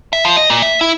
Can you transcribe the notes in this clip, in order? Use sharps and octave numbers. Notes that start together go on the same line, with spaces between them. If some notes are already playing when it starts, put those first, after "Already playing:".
E5
F3
D#5
A#2
E5
E4